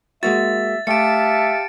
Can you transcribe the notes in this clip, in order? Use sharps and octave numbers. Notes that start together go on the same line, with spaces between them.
G#3 A#3 F#4 E5 A6
A3 G4 E5 F5 A5 C#7 D7